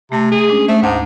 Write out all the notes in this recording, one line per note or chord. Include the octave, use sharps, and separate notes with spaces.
C3 A3 A5
G#4
G#3 C#4 D4
A3 C5 E5
D2 G#2 A5 D6